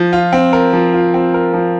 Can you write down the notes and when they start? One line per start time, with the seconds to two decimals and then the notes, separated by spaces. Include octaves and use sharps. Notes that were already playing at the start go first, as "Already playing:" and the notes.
Already playing: F3
0.13 F4
0.33 C4
0.53 A#4
0.73 F3
0.93 F4
1.14 C4
1.34 A#4
1.53 F3